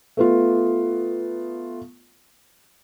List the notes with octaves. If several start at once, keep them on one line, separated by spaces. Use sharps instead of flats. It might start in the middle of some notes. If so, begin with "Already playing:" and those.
A3 B3 F4